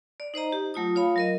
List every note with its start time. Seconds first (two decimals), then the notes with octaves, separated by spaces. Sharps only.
0.20 D5
0.34 D#4 C5 D#5 A#5
0.53 G4
0.74 F#3 A3 F4 D#6
0.95 F4 C#5 F5 B5
1.16 F#3 A#4 D#5